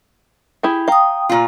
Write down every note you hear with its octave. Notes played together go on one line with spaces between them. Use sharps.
E4 G4 G#4
F5 G5 A#5 D#6
A#2 F4